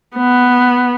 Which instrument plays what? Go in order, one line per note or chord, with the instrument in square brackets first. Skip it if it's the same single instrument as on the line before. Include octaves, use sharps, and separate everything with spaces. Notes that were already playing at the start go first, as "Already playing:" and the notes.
[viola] B3